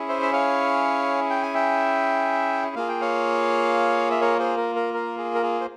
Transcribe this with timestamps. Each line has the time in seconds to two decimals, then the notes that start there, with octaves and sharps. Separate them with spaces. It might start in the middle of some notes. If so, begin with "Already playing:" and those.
Already playing: C#4 E4 G#4
0.09 C5 E5
0.22 E5
0.33 C#5 F5
1.30 G5
1.42 G#5
1.54 E5 G5
2.76 A#3 F4 G#4 F5
2.88 G5
3.01 C#5 F5
4.11 E5
4.21 A#4 C#5
4.39 G#4 C5
4.57 A#4
4.76 A#4
4.94 A#4
5.18 G#4
5.35 A#4
5.43 G#4
5.61 C5